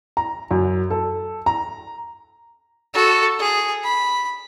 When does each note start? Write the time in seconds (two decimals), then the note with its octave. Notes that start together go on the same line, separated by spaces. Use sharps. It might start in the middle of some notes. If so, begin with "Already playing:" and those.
0.17 A#5
0.51 F#2
0.90 A4
1.46 A#5
2.94 F#4 A4
3.39 G#4
3.84 B5